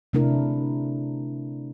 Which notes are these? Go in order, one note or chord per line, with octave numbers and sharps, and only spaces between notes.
C3 A3 D4 E4 A#4